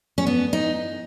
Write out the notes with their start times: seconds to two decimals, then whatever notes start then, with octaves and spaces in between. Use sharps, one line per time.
0.18 C#4
0.27 B3
0.53 D#4